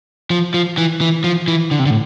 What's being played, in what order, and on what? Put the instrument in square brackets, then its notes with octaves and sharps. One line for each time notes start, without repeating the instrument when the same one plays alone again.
[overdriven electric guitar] F3
F3
E3
E3
F3
E3
D3
C3
D3
A2